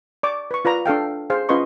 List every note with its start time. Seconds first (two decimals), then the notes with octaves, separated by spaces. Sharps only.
0.23 D5 C#6 D6
0.51 B4 C#6
0.65 F4 B4 D5 A#5
0.86 D4 A4 F5 G5
1.30 G#4 C5 F5
1.49 C#4 F4 B4 D#5 C6 C#6